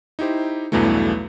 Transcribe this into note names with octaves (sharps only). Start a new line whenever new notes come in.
D#4 E4 G4 C5
B1 E2 G2 E3 F#3 A3